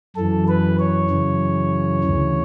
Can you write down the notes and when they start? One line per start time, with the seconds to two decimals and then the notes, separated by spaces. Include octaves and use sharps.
0.16 F#2 E3 A4
0.48 B4
0.79 C#5
1.10 F#2 C#3 E3
2.04 D2 C#3 E3